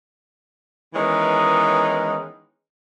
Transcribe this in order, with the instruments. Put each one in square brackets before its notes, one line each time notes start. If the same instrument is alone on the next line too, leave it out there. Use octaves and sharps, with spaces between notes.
[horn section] D#3 E3 G#3 B3 C#4 D#4